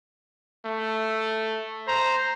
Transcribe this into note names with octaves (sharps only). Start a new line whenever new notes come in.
A3
C5 A#5